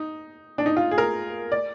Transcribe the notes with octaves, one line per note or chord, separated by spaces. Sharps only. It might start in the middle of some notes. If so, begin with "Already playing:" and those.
Already playing: D#4
D4
D#4
F4
G#4
A#4
D5